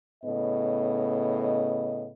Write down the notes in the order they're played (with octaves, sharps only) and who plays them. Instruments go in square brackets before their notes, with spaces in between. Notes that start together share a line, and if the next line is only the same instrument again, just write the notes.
[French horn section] A2 C#3 B3 D#5